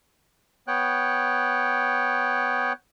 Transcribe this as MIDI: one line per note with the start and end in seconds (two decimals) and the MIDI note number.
0.68 2.73 59
0.68 2.73 73
0.68 2.73 79
0.68 2.73 90